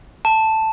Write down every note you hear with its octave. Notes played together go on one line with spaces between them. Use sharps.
A5